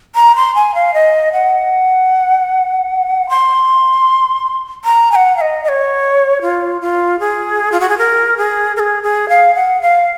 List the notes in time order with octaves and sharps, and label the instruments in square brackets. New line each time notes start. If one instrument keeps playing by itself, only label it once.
[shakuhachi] A#5
C6
G#5
F5
D#5
F#5
C6
A#5
G#5
F#5
F5
D#5
D#5
C#5
F4
F4
G#4
F4
F#4
G#4
A#4
G#4
A#4
G#4
G#4
F5
F#5
F5